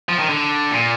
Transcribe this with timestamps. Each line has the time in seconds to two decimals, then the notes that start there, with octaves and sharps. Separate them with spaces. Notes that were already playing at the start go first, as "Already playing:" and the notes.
0.09 F3
0.19 D#3
0.29 D3
0.71 A#2